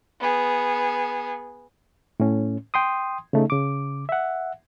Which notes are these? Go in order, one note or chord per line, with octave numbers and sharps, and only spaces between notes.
B3 G#4
A2 C#4
G5 C6 D#6
C#3 A3 D#4
C#3 D6
E5 F#5